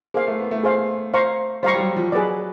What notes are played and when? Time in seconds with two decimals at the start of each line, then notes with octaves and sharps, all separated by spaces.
0.14 A#3 G#4 C5 F5
0.27 A3
0.39 B3
0.51 A3
0.63 G#4 C5 F5
1.14 C5 F5 A#5 C#6
1.63 G3 C5 F5 A#5 C#6
1.74 G3
1.80 F#3
1.96 F3
2.12 F#3 G#4 B4 D5